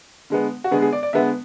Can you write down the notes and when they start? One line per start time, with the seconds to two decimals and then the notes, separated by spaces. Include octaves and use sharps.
0.30 D3 G#3 B3
0.64 F#4
0.71 D3 G#3 B3 G#4
0.82 G#4
0.93 D5
1.03 D5
1.13 D3 G#3 B3 E5